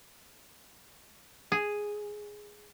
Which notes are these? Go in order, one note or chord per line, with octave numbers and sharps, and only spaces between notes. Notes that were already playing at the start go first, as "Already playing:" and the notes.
G#4